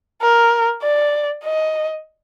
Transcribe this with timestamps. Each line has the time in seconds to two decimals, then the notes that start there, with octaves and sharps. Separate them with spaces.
0.22 A#4
0.83 D5
1.44 D#5